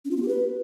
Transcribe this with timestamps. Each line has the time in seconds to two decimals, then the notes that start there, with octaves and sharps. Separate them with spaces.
0.05 C#4
0.11 F4
0.17 B3
0.22 G4
0.28 B4